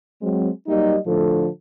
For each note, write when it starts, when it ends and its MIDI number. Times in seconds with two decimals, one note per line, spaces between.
0.22 0.50 54
0.22 0.50 56
0.22 0.50 60
0.68 0.96 54
0.68 0.96 55
0.68 0.96 58
0.68 0.96 63
0.68 0.96 67
0.68 0.96 75
1.07 1.47 45
1.07 1.47 50
1.07 1.47 53
1.07 1.47 57
1.07 1.47 69